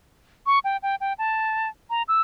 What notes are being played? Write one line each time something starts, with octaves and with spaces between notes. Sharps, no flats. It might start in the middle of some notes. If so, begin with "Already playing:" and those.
C#6
G5
G5
G5
A5
A#5
E6